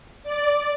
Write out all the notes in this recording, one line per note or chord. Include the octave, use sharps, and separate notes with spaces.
D5